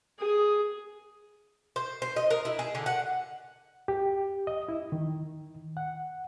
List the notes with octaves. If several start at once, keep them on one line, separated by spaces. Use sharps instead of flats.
G#4
C5
C5
D#5
A#4
E4
G#4
D3
F#5
G4
D#5
E4
D#3
F#5